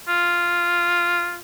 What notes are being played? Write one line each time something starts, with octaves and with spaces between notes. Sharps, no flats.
F4